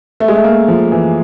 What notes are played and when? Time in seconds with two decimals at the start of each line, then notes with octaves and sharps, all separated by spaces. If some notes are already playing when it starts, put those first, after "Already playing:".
0.20 A3
0.28 G#3
0.35 A3
0.44 A#3
0.68 F3
0.92 E3